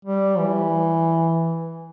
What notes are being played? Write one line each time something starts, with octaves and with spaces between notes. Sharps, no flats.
G3
E3